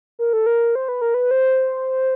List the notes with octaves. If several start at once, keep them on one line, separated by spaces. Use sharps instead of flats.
A#4
A4
A#4
C5
B4
A#4
B4
C5